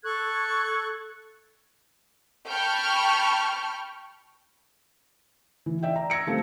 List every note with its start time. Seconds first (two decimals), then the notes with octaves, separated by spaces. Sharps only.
0.04 A4 C#6 F#6 G#6
2.48 G5 A5 B5 C#6 F6 G6
5.66 E3
5.83 D5 E5 G5
5.96 A#5
6.10 E6 G#6 A#6 C#7 D7
6.27 F3 G3 A3 C4 A4